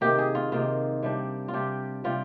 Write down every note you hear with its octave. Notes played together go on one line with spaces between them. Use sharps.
C3 D#3 A#3 G4
G#4
F4
C3 D#3 A#3 F4
C3 G3 D4
F4
C3 G3 D4 G4
C3 G3 C4 F4